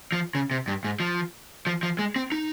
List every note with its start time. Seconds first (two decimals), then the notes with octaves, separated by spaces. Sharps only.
0.12 F3
0.35 C#3
0.51 C3
0.68 G2
0.84 G#2
1.00 F3
1.67 F3
1.83 F3
1.99 G#3
2.16 C4
2.32 D#4